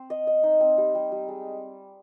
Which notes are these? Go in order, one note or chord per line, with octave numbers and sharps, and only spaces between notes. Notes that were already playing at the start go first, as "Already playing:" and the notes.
Already playing: C4 C5
D#5
D#5
D#4
C4
G3
G3
G3
G#3